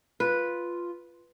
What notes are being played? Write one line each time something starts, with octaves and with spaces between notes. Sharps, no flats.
F4 B4